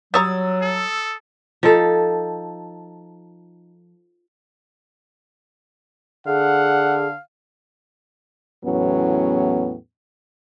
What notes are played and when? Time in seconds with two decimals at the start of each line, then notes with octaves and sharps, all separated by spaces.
0.14 F#3 G3 C#5 A#5 D#6 E6 A6
0.62 A4
1.63 F3 D#4 A4
6.27 D3 G#4 F5 F#5
8.65 E2 A2 F#3 B3 C#4